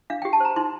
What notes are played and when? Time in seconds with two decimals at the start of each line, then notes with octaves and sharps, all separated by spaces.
0.10 D4 F5
0.22 G4 G5
0.33 A5
0.40 C5 A#5
0.56 D#4 C6